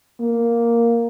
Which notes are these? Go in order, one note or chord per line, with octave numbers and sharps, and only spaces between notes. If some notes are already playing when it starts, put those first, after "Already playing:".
A#3